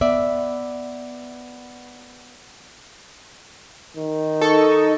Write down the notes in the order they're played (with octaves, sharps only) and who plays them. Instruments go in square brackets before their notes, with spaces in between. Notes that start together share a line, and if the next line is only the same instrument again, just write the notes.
[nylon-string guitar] B3 D5 E5
[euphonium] D#3
[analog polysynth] D#4 D#5 [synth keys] A4 C#6